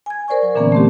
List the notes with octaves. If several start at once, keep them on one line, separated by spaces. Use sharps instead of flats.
G#5 G#6
A#4 C5 D5 G#5 C#6
F#3
A#2 D3 E3 A#3 B3 C#4
A3 C4 G4